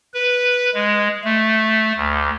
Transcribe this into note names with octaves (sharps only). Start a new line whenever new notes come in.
B4
G#3
A3
D2